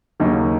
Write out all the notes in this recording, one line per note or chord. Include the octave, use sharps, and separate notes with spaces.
D#2 C#3 F#3 A#3 D#4